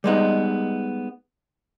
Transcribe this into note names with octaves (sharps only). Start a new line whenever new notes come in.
G3 G#3 B3 D#4